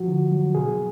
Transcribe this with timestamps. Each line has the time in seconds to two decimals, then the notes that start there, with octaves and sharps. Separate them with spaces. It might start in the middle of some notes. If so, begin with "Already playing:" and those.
Already playing: F3 F#4
0.08 D3
0.32 F#3
0.55 B2 G#4